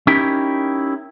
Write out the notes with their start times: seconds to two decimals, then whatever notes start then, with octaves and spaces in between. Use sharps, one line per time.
0.07 C#4 D#4 E4 G4 A#4